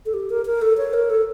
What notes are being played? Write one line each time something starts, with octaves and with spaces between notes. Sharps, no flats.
A4
G4
A#4
A#4
A4
C#5
A#4
A4